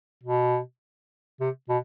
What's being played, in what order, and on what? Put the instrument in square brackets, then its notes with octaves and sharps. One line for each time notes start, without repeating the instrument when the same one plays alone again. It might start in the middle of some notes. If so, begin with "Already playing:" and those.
[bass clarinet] B2
C3
B2